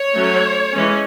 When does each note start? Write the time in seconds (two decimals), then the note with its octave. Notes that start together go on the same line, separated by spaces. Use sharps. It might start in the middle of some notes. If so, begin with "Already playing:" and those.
Already playing: C#5
0.14 F#3 A3 C#4
0.73 E3 G#3 C#4